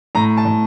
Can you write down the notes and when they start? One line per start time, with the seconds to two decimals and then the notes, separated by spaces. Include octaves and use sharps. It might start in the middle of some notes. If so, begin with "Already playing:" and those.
0.15 A2 A#5
0.37 A5
0.45 A2